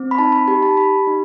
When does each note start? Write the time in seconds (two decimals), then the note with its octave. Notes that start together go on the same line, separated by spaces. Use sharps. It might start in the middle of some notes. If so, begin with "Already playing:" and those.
Already playing: C4
0.11 B5
0.18 D#4 A5
0.32 B5
0.48 G4 B5
0.62 A5
0.77 G4 B5
1.07 D#4